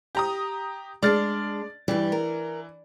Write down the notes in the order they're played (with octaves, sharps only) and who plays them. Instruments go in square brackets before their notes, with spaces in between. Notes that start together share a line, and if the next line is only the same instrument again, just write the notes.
[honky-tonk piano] G4 A#5 D#6
[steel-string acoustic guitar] G#3 D4 [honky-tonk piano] D5 F6 A6
[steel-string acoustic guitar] G2 G3 [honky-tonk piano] E3
[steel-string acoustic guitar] A#4